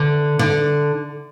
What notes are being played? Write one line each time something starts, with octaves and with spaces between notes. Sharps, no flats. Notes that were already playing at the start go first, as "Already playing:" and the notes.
Already playing: D3
D3